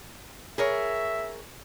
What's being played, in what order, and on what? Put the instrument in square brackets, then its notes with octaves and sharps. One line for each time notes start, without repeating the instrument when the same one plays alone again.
[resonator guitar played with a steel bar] G#4 A#4 C#5 [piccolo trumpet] E5